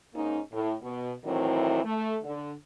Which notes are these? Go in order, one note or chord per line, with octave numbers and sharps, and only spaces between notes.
G#2 A#3 C#4 D#4
A2
B2
A2 D#3 E3 F#3 C4 E4
A3
D3